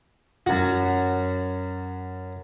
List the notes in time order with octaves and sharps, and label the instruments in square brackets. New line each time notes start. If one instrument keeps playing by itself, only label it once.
[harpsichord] F#2 F#4